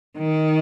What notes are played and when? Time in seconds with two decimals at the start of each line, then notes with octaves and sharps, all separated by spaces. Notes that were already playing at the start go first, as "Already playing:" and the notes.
0.18 D#3